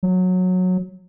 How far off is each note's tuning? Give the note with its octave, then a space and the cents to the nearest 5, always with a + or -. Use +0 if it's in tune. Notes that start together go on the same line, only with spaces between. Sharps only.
F#3 -15